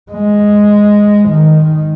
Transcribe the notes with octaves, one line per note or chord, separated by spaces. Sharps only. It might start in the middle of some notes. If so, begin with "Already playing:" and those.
G#3
D#3